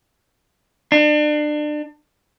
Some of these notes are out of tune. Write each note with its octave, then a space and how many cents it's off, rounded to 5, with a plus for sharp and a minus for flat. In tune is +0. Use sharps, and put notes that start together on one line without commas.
D4 +30